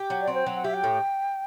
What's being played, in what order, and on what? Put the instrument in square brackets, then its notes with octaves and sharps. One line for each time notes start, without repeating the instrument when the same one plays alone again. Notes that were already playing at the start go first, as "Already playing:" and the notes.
Already playing: [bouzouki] G4
F#3
[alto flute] D5
[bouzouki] C4
[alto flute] C5
[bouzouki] F#3
[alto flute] F#5
[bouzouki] G4 [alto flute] E5
[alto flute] G5
[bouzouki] A2